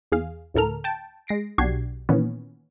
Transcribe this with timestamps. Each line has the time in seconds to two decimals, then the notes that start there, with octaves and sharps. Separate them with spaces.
0.12 E2 G#4 F5
0.54 D2 A2 A4 A#4 F6
0.84 G5 A5 D7
1.27 G#3 A#6 C7 D7
1.58 B1 D4 F#4 G4 G#6 C7
2.09 A#2 D#3 E3 B3 C#4